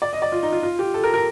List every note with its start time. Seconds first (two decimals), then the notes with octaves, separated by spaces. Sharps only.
0.02 D5
0.13 D#5
0.22 D5
0.32 F4
0.43 D#4
0.53 F4
0.63 F4
0.79 G4
0.94 A4
1.04 A#4
1.14 A#4